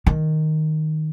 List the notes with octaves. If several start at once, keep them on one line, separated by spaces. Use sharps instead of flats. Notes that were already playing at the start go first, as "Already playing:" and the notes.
D#3